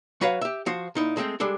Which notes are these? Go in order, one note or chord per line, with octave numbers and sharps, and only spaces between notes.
F#3 F#4 B4 C#5 F5
G4 E5
F3 F#4 C5
A#2 D#4 E4
G#3 A3 C4 G5
G3 G#3 D4 A4